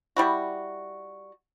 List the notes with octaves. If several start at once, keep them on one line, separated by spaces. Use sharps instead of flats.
G3 E4 F#4